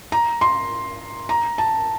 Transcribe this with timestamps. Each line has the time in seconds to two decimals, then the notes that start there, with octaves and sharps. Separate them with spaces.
0.12 A#5
0.41 C6
1.29 A#5
1.58 A5